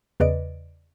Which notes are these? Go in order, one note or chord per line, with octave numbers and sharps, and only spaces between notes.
E2 C#3 B4 D5 D#5 D7